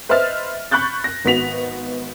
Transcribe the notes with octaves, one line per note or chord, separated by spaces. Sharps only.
B4 C5 D#5 E5 F6 A6
B5 C#6 F#6 G6 A6
A#6
G#1 B3 F#4 B6 F7